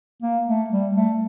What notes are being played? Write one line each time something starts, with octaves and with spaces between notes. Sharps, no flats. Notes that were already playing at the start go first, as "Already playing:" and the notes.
A#3
A3
G3
A3